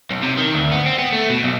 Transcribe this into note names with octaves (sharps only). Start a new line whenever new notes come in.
B1
C3
D#3
D2
B3
C4
B3
A3
B2
B1